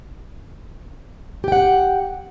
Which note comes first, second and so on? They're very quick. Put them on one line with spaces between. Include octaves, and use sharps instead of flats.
G4 G5 F#5